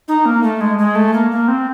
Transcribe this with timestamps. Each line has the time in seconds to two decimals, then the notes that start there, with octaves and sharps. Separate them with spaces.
0.08 D#4
0.26 A#3
0.43 A3
0.61 G#3
0.78 G#3
0.95 A3
1.14 A#3
1.31 A#3
1.48 C4